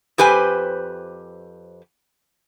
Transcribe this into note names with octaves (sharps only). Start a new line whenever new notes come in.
F2 G4 B4 C5 G#5